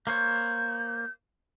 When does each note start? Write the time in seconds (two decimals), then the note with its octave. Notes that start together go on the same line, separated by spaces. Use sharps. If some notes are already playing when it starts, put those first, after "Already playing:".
0.07 A#3 C5 C#5 G6